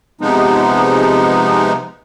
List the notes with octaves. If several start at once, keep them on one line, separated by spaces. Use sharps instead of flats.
C3 F3 G#3 B3 D#4